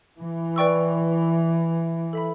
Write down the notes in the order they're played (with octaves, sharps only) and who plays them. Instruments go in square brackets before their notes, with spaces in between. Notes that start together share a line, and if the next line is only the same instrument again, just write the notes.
[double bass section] E3
[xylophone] B4 D5 G5 C#6 E6
A4 E5 B5